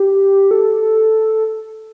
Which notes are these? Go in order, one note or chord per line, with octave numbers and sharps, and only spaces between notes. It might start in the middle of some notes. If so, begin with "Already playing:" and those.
Already playing: G4
A4